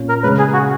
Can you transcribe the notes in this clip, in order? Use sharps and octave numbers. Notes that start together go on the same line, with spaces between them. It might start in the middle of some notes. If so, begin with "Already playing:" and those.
Already playing: A#2 C#4
A#4
C#3 G#3 C#4 B4
G#4
F#4